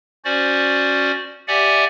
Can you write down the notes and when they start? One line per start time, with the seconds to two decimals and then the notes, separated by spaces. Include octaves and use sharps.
0.25 C#4 F#4 C5 D5
1.48 G4 D5 E5 F#5 G#5